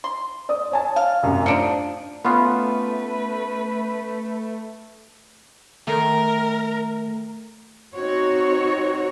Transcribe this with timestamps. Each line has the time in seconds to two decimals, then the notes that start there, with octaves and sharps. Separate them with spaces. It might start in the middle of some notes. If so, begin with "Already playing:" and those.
0.04 C6
0.49 D5 D#6
0.72 C#5 G#5 A5
0.96 F5
1.23 C2 F#2 A2
1.46 F3 D4 D#4 C#7
2.25 A3 B3 C#4 F4 B4
5.87 D#3 A3 A#4
7.94 C4 D#4 F#4 C#5